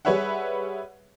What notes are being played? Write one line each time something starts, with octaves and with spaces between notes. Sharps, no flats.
G3 G#4 B4 C#5 E5 F#5